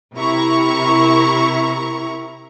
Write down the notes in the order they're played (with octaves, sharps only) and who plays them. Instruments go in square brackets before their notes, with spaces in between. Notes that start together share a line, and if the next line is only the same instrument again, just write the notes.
[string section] C3 E4 A#4 A#5 C#6